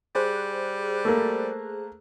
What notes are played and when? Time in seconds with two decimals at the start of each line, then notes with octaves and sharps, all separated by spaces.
0.15 G3 G#4 C5 F#6
1.05 A3 A#3